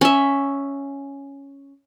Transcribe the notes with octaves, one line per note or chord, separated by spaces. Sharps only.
C#4 E5